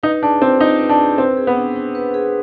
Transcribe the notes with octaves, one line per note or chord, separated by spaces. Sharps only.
D#4 B4
D4 G#4
C4 F4
D#4 F4
B4
D4
G#4
C4 B4
G#4
B3
D4
D4
B4
G#4